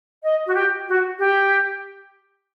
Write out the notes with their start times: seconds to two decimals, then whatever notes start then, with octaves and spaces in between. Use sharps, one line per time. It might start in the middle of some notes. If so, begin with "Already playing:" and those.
0.24 D#5
0.46 F#4
0.55 G4
0.87 F#4
1.19 G4